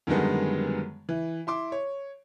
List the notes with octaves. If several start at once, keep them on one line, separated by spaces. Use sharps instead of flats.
F#2 D3 D#3 G3 G#3 B3
E3
E4 C6 D6
C#5